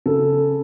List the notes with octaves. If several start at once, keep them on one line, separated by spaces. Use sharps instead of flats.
C#3 A4